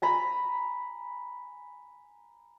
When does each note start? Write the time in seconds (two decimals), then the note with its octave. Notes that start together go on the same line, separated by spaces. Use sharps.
0.02 G#5 A#5 B5